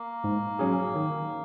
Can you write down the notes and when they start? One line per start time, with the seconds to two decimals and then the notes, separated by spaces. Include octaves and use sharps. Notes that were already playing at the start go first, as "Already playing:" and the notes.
Already playing: A#3
0.24 G#2
0.59 F#3 C#4 G#4
0.95 D#3